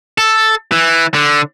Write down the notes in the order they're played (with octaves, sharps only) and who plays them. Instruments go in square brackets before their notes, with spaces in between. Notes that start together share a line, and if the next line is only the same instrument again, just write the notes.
[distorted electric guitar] A4
E3
D3